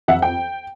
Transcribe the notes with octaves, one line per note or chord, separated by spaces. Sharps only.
F2 E5 F#5
G5